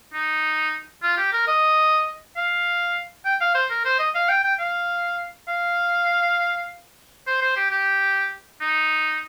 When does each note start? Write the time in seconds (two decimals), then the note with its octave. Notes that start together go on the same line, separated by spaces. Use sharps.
0.13 D#4
1.03 F4
1.18 G4
1.33 A#4
1.47 D#5
2.36 F5
3.25 G5
3.40 F5
3.55 C5
3.70 A#4
3.85 C5
3.99 D#5
4.15 F5
4.29 G5
4.44 G5
4.59 F5
5.48 F5
7.27 C5
7.41 C5
7.56 G4
7.71 G4
8.61 D#4